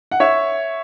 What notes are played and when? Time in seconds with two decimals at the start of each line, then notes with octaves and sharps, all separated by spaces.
0.11 F#5
0.20 C#5 E5